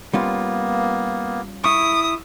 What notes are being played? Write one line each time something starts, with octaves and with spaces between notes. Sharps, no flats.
G3 A#3 B3 C#4 F4
E4 C#6 D#6